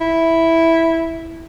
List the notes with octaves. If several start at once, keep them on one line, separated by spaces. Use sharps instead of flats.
E4